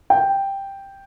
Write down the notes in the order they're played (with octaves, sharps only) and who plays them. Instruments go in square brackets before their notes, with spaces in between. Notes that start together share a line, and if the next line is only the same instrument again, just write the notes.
[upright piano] G5